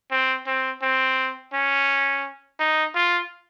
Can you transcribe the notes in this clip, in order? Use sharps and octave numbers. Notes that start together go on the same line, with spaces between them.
C4
C4
C4
C#4
D#4
F4